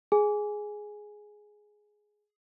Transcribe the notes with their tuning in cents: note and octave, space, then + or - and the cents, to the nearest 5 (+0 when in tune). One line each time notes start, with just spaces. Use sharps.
G#4 +10 G#5 +0